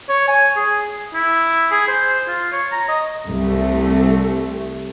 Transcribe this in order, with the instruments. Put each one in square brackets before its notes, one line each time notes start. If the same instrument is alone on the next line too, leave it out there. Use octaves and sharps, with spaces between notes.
[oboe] C#5
G#5
G#4
E4
G#4
C5
F4
C#5
A#5
D#5
[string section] C2 A3